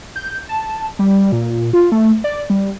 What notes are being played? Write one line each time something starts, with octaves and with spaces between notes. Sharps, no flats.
G6
A5
G3
A#2
F4
A3
D5
G3